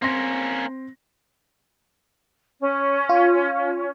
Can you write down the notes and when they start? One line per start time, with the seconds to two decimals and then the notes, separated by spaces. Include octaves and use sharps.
0.02 A#3 C4 C#4 C6 A#6
2.60 C#4
3.09 F4